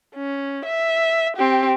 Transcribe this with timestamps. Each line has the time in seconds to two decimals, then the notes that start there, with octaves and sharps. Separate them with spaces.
0.15 C#4
0.65 E5
1.37 C4 G4